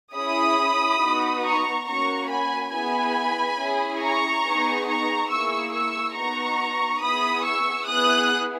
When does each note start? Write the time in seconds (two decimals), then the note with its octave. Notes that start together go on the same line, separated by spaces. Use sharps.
0.14 C#4 E4 G#4 B5 D#6
1.00 B3 D#4 F#4
1.43 A#5 C#6
1.86 A#3 C#4 F#4 A#5 C#6
2.29 G#5 B5
2.72 B3 E4 G#4 G#5 B5
3.58 C#4 E4 G#4
4.01 A#5 C#6
4.44 B3 D#4 G#4
4.87 A#5 C#6
5.30 A#3 E4 G#4 C#6 E6
5.73 C#6 E6
6.15 B3 D#4 F#4 A#5 C#6
7.01 B3 E4 G#4 B5 D#6
7.44 C#6 E6
7.87 B3 E4 G#4 D#6 F#6